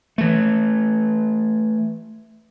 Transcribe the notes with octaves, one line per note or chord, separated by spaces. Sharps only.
E3 A3